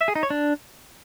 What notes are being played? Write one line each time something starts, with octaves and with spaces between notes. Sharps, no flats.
E5
G#4
D#4
C#5
D4